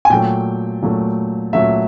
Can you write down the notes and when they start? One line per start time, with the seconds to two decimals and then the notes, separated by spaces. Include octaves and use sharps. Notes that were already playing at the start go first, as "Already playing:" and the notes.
0.05 G#5
0.10 A#2 F#3 A3 G5
0.82 A#2 F#3 A3
1.53 A#2 F#3 A3 E5